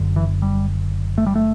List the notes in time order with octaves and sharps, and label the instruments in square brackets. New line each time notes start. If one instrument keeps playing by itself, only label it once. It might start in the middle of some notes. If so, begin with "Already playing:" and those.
Already playing: [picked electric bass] F#1 F#2 D3
E3
G3
A3
G3
A3